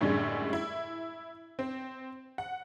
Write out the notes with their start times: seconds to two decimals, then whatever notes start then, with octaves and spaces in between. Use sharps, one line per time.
0.01 F#2 A2 D3 G3 G#3
0.53 E4
1.59 C4
2.38 F#5